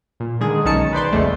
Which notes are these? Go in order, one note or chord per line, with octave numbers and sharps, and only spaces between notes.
A#2
D3 D#3 G#3 G#4
B1 D#3 C#4 D#4 A5 C#7
B4 C5 D5 C6
B1 E2 C#3 G#3 A3